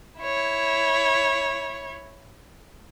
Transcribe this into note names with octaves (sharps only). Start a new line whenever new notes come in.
E4 C#5